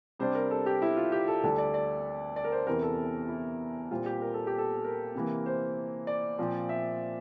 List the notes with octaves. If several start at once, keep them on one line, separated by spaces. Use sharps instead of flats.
C3 G3 D4 C5
A#4
A4
G4
E4
F4
G4
A4
D2 D3 G3 D4 A4
D5
D5
D5
A#4
C5
E2 C3 E3 A#4
A4
E4
A#2 G3 C4 F4
G4
A#4
A4
G4
A4
A#4
C3 E3 A#3
C5
D5
A#2 F3 C4
E5